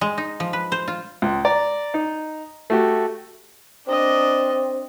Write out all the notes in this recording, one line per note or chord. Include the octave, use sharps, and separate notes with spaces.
G#3
D#4
F3
B4
C5
F4
C#2
D5 A#5
D#4
A3 F#4 G4
C4 D4 D#5